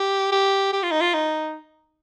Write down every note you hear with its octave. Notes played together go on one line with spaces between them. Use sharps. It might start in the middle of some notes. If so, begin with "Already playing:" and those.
Already playing: G4
G4
G4
F4
D#4
F4
D#4